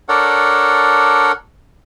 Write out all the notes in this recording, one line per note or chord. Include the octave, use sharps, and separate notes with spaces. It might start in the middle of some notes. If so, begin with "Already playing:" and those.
D4 A4 A#4 C#5 D5 F#5